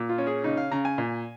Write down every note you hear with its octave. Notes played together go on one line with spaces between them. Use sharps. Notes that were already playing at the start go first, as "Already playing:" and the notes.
Already playing: A#2
F4
C#4
G#4
C#3 D#4
F5
C#3 A#5
G#5
A#2